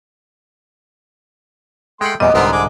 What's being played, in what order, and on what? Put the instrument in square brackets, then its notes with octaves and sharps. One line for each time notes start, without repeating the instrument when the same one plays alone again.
[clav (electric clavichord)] G#3 F#5 [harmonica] A3 G5 C6
[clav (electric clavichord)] E2 A#2 G3 [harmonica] B3 G4 [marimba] D#5
[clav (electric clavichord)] C2 G#2 D3 [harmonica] B3 C4 A#4
[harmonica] G#3 G#5 D6